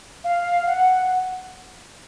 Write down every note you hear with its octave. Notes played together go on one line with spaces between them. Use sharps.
F5
F#5